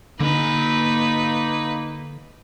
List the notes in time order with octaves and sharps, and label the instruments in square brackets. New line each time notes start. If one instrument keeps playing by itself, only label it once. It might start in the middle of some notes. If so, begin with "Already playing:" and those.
[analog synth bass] D3 [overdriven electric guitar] A#3 G#5 [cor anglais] D#4 [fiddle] B4